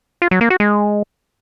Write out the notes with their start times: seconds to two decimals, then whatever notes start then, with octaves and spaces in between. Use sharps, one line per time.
0.22 F4
0.31 F#3
0.41 A#3
0.50 F#4
0.60 G#3